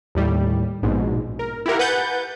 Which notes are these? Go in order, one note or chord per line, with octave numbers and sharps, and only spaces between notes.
D#2 A2 G3
A#1 G#2 B2
A#4
E4 F4 G4 A#4 F#5
B4 F#5 G#5 G6 A6